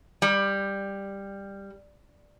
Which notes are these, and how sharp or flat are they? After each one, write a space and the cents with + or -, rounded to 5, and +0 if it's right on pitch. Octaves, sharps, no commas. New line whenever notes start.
G3 +10